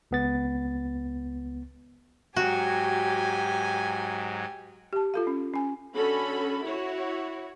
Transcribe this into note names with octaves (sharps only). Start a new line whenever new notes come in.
C#2 B3 A6
G#2 F#3 F#4 G4 G#5
G4 A5
F4 A4 F5
C#4
C#4 G#5
D3 C#4 F#4 A4 B5
E4 F#4 C#5